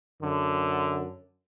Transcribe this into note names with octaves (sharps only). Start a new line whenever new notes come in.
F#2 D3